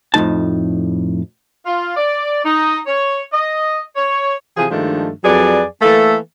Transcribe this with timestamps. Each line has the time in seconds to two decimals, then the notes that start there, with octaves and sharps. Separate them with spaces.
0.14 F2 A2 F3 D#4 A5
1.66 F4
1.96 D5
2.45 D#4
2.86 C#5
3.33 D#5
3.96 C#5
4.57 C3 E3 F3 G#4
4.70 G2 D#3 F3 G#3 A3 D4
5.23 F2 F#3 G#4 B4 D5
5.82 E3 A3 A#3 A4